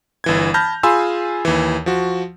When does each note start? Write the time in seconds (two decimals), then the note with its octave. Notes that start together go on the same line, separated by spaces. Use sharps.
0.24 G1 E3 G#6
0.54 A5 B5 F6 G6 A#6
0.83 F4 G#4 G#5 B5 C6 E6
1.45 D#2 E3
1.86 F3 F#4